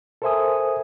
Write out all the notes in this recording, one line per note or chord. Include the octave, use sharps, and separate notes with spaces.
A4 A#4 C5 E5 G#5 D#6